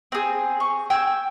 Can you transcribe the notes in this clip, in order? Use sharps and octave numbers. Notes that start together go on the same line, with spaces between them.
C4 G#4
C#6
G5 G#5 E6